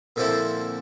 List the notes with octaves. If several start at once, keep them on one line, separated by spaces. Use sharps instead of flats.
A#2 D3 F3 C4 E4 A4